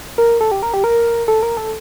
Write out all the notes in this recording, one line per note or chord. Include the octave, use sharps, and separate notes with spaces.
A#4
A4
G4
A#4
G4
A#4
A4
A#4
A4